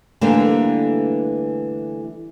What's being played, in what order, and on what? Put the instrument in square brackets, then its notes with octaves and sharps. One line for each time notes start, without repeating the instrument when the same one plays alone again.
[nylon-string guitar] D3 E3 G3 A3 A#3 D4